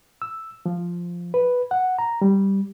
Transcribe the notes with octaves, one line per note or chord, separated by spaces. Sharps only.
E6
F3
B4
F#5
A#5
G3